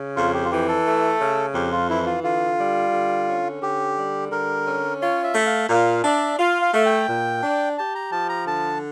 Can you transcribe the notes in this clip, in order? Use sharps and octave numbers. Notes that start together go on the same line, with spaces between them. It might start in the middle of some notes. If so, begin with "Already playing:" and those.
Already playing: C#3
F2 F4
G4
F4
E3 G4
A4
A3
C#3
F2 G4
F4
E3 E4
F4
D3 F4
G3
D3
C#4
D3 G4
G3
D3 A#4
C#4
F4 C#5
E5
A3
F5
A#2 F5
D4 E5
F4 F5
F5
A3
G5
A#2
D4
G4 A5
A#5
F3 A5
A#5
D3 A5